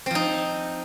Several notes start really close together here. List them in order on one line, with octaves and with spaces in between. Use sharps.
C4 F3 D#4